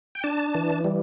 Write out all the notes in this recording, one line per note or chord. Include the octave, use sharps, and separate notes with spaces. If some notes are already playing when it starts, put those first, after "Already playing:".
G5
D4 A5
E3
G3